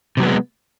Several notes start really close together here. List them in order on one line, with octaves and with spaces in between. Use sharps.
C3 F#3 B3 G#3